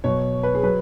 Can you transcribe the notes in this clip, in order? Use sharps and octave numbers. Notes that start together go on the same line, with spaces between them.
B2 F#3 C#5
B4
G#4
F#3 B4